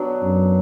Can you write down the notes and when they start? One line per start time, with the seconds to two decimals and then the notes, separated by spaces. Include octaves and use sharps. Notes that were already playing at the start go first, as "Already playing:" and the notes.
Already playing: B2 F#3 B3 D4
0.23 F#2